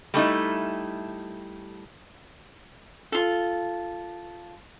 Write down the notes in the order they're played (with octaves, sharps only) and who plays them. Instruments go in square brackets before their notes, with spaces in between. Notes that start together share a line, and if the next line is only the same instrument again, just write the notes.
[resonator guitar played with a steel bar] G3 A3 D#4 E4
[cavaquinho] F4 A4